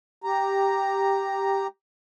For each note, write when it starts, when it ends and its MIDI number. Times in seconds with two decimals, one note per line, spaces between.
0.24 1.67 67
0.24 1.67 82